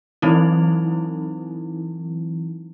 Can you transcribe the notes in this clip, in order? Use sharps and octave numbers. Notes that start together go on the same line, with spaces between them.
E3 F#3 C4 D#4 E4